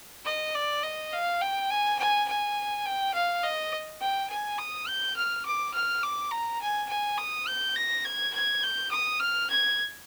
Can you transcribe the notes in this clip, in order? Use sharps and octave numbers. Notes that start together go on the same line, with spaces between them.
D#5
D5
D#5
F5
G5
G#5
G#5
G#5
G5
F5
D#5
G5
G#5
D#6
G6
F6
D6
F6
D6
A#5
G#5
G#5
D#6
G6
A#6
G#6
G#6
G6
D#6
F6
G#6